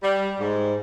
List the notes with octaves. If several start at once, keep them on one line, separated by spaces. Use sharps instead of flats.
G3
G#2